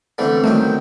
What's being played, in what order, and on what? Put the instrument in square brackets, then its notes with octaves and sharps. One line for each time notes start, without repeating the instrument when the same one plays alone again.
[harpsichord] D3 E3 A3 [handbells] B3 C4 C5
[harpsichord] D#3 F#3 G5 [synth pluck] G3 A3